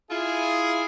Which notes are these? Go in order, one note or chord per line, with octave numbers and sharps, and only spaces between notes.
E4 F4 G#4